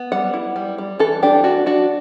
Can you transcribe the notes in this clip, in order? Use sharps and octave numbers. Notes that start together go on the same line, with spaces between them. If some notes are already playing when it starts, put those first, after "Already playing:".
Already playing: B3
G3 F#5
E4
G3
G3
E3 A4
D4 G4
D4 F#4
D4 F#4